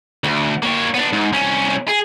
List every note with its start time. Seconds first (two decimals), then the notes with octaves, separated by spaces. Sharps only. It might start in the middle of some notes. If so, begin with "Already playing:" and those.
0.24 D2
0.63 A#3 C#5
0.94 B3 D4
1.13 G#2
1.33 C2 C#4
1.88 G#4